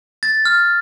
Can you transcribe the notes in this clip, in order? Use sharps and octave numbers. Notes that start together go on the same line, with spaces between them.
A6
F6